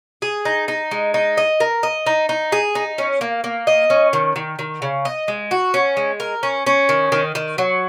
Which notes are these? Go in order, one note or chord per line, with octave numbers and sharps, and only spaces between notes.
G#4
D#4
D#4
G#3
D#4
D#5
A#4
D#5
D#4
D#4
G#4
D#4
C#4
A#3
A#3
D#5
C#4
D#3
D#3
D#3
C#3
D#5
G#3
F#4
C#4
G#3
A#4
C#4
C#4
D#3
D#3
D#3
F#3